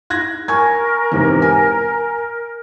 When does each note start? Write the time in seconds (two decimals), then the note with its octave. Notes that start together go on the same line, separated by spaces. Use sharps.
0.10 F#6 G#6 A#6
0.48 A#4 G#5 C#6 G#6
1.12 E2 G#2 C3
1.42 G#5